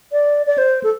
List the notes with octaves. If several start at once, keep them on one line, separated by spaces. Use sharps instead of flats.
D5
D5
C5
A4